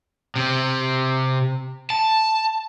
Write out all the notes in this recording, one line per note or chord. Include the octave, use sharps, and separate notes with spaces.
C3
A5